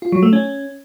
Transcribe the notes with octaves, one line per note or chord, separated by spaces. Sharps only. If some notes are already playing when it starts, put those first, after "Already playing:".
F4
F#3
A3
C#4